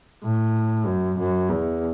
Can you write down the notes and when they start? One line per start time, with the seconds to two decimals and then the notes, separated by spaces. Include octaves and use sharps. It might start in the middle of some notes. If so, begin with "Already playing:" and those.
0.24 A2
0.86 F#2
1.18 F#2
1.49 E2